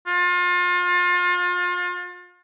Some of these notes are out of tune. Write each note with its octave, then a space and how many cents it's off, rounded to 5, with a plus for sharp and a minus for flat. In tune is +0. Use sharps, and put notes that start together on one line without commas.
F4 +35